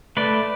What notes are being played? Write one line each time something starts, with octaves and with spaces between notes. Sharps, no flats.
A3 B4 D5